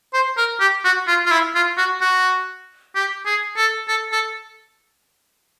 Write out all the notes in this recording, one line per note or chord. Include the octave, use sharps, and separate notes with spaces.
C5
A#4
G4
F#4
F4
F4
E4
F4
F#4
F#4
G4
G#4
A4
A4
A4